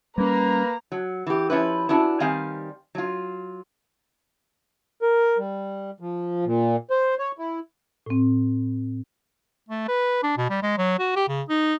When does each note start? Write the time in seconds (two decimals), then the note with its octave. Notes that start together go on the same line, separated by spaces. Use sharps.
0.18 G3 A#3 C#4 B4 A#5
0.92 F#3
1.26 E3 G4
1.50 F3 C#4 E4 B4
1.89 C#4 D4 E4 F#4
2.20 D#3 G3 C4 F5 G#5
2.95 F#3 F4
5.02 A#4
5.38 G3
6.00 F3
6.46 A#2
6.90 C5
7.19 C#5
7.38 E4
8.06 A2 C4
9.69 A3
9.88 B4
10.23 D4
10.38 B2
10.50 G3
10.62 G#3
10.78 F#3
10.99 F#4
11.16 G4
11.28 C#3
11.49 D#4